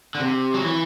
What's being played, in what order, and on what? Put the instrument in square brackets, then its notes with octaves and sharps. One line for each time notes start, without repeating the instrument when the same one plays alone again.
[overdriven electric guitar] D3
C3
F#3
E3